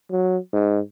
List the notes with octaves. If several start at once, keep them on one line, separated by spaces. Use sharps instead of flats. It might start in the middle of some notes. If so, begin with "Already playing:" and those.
F#3
G#2